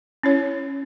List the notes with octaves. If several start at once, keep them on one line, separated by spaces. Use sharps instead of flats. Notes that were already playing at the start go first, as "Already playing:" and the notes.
C#4 E4 C#5